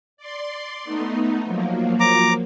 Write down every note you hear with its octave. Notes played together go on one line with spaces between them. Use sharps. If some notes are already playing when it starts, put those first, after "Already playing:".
D5 C6
A3 B3 D#4
F3 F#3 A#3
A#5 D6